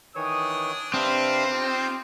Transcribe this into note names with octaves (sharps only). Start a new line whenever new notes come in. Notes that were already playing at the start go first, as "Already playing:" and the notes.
D#3 E3 D4 C#5 D#6
C3 C4 D4 B4 F5 F6
D#4 F4 G4 D6